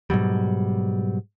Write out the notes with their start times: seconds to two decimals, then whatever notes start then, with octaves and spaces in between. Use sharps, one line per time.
0.10 G#2 B2 F#3 G3